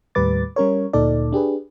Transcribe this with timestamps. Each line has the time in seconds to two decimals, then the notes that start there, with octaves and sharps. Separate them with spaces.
0.15 D#2 A2 G3 B4 D6 A6
0.56 G3 C#4 A#4 C#5
0.93 D2 A#2 D#4 A4 D5
1.32 D4 G4 G#4 B4